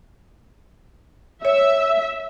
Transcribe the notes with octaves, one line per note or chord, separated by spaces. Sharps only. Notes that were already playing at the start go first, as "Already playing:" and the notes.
C#5 E5